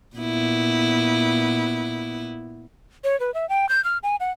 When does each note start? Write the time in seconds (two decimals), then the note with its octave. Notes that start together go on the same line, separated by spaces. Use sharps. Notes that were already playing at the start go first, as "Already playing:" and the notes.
0.16 A#2 B3 E4
3.04 C#5
3.20 B4
3.34 E5
3.49 G5
3.69 G6
3.85 F6
4.03 G#5
4.20 F#5